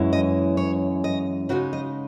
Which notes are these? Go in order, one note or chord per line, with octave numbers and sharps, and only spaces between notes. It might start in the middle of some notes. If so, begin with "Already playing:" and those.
Already playing: F#2 E3 G#3 C#4 E4
D#5
C#5
D#5
C#3 G#3 D#4 F#4
D#5